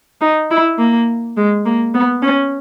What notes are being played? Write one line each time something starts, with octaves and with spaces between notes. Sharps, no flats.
D#4
E4
A#3
G#3
A#3
B3
C#4